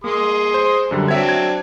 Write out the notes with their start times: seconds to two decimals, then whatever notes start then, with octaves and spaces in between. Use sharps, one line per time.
0.04 A#3 G#4 C6 D#6
0.54 C5
0.91 F#2 D3 G3
1.08 F#3 C4 D4 E5 G#6
1.29 G#6